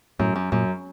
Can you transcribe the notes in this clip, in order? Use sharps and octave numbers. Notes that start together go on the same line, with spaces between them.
F#2 A2
F#2
F#2 A#2